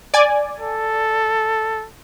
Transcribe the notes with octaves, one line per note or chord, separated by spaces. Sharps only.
D5 G#5
A4